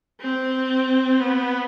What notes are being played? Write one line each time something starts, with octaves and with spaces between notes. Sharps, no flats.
C4
B3